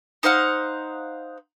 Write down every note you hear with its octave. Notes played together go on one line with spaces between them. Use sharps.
D#4 C5 F5 F#5